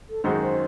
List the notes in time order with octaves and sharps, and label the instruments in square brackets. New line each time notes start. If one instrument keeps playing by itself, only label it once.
[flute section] A4
[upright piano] F#2 D#3 G#3 D#4 F#4 [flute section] C5
[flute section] C5